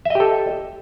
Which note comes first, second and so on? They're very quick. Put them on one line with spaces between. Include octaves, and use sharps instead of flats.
E5 D#5 G4 A4